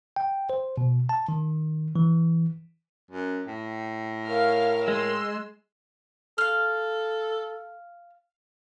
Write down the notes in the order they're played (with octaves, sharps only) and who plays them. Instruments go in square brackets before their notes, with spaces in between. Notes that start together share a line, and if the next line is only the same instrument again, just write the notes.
[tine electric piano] G5
C5
B2
A5
D#3
E3
[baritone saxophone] F#2
A2
[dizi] A#4 [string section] C#5 F5 F6
[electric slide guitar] G#3 [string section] C6 E6
[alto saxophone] A4 [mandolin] F5 F6